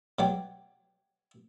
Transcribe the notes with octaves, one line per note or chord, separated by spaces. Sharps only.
B2 F#3 G4